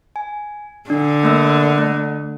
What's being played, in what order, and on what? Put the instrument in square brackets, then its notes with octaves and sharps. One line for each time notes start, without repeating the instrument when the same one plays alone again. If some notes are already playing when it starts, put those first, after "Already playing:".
[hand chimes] G#5
[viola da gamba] D3 [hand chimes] D4
[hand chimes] A3 A#3 E6
A3